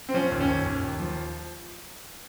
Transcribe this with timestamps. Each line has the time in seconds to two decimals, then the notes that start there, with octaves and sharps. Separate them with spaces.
0.09 C4
0.14 F3 C#4
0.32 D#2
0.41 C#4
0.49 D#2
0.66 D#2
0.83 D#2
1.00 F3